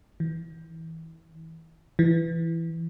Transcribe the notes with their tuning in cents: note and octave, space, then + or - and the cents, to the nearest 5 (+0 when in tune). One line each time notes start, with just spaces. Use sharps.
E3 -25
E3 +10